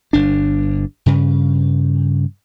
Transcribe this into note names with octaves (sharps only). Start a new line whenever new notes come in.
G1 D4
G2 C#3